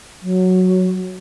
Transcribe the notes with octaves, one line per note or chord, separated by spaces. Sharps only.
F#3